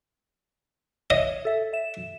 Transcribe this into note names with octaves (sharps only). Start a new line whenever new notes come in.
C#5 D#5 E5
A4 E5
E5 E7